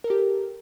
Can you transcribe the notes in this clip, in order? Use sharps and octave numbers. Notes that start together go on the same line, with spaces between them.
G4 A4 A#4